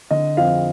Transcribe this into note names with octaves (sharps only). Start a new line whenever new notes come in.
D3 D#5
F2 F5